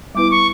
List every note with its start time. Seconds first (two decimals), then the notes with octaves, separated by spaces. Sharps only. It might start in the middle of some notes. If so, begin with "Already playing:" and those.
0.15 G3 B3 E4 B4 D6
0.31 C#6